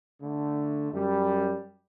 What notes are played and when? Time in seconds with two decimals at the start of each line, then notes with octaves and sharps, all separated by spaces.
0.22 D3 A3
0.92 F#2 G3